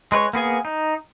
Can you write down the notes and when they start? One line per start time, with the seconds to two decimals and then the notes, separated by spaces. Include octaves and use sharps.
0.12 G#3 B4 C#5
0.33 A#3 B3 G#4 G#5
0.65 D#4